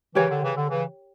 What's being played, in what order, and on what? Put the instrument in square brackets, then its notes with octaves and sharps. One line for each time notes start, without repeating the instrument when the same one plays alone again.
[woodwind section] C#3 E3 [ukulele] G4 A#4 C#5 G5
[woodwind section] D3
C#3 E3
D3
C#3 E3